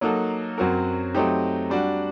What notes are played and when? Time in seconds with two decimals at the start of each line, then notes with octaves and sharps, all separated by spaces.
0.01 F#3 A#3 D#4 F#4 A4
0.58 F#2 F#3 C4 F#4 A#4
1.14 F#3 A3 C4 D#4 G4
1.70 G3 D4 F#4